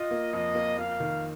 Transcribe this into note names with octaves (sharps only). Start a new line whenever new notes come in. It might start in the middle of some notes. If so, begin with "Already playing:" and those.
Already playing: F4 D#5
A#3
F2 D#5
A#3
A#3 F5
D#3